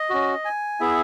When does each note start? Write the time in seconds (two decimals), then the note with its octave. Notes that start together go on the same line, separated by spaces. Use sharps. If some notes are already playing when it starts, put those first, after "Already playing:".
Already playing: D#5
0.10 C#4 F#4
0.45 G#5
0.80 B3 E4 G#4 E5